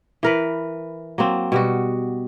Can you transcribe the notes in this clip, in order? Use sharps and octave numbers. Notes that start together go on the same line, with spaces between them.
E3 A#4 B4
F#3 A#3 C4
B2 G3 F#4